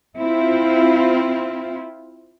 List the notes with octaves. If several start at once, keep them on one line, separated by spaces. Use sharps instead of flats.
C4 E4 F4